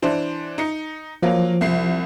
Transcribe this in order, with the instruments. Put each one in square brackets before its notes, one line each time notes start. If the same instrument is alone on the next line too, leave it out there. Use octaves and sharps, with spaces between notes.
[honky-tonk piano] E3 D4 C5
D#4 C#7
[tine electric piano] F3 [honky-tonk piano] F#3 A#3 F4
[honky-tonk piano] C2 C7